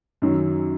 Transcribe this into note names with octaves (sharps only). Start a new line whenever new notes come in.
F#2 D#3 F#3